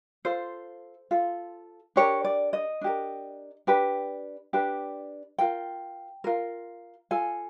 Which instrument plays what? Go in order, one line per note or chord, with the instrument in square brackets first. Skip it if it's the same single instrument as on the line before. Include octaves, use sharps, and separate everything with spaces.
[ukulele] F4 A4 C5
F4 A4
D4 G4 A#4 C#5
D5
D#5
D4 G4 A#4
D4 G4 B4
D4 G4 B4
F4 A#4 G5
F4 A#4
F4 A4 G#5